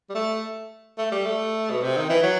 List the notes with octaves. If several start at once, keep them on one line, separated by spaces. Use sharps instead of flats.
G3
A3
A3
G3
A3
B2
C3
D#3
E3
F#3